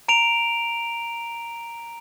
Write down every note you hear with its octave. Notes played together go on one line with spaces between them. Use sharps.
A#5 D7 F7